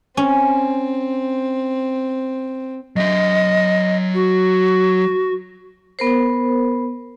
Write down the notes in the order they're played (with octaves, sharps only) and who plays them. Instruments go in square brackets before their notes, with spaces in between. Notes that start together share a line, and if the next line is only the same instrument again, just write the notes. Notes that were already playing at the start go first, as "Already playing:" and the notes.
[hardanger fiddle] C4 [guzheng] C#4
[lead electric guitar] F#3 E5 [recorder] D#5
[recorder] F#4
[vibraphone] B3 A#4 C5